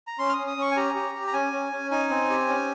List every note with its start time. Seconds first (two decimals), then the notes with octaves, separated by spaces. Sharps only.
0.07 A#5
0.19 C#4 C6
0.29 F6
0.33 C#4 D#6
0.47 D#6
0.57 C#4 C#6
0.71 G#5
0.77 G4 A#5
0.95 G4
1.15 G4
1.27 A#5
1.33 C#4 G#5
1.53 C#4
1.72 C#4
1.91 D#4 G#5
2.10 C4
2.30 G4
2.48 C#4